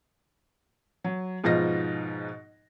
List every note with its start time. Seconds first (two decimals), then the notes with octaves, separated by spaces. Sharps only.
1.04 F#3
1.44 G#2 B2 F3 D#4 F4 A#6